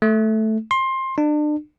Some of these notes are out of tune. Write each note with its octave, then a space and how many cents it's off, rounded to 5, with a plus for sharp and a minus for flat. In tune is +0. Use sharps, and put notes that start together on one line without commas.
A3 -5
C6 +20
D4 +35